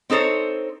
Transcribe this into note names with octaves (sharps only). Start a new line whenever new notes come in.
C4 D#4 A4 C5 C#5